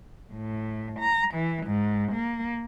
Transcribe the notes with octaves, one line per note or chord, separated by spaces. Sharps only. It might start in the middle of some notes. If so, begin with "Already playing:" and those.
A2
A#5
E3
G#2
A#3